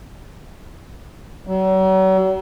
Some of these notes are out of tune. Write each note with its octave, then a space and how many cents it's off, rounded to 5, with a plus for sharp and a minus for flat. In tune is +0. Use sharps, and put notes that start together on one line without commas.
F#3 +40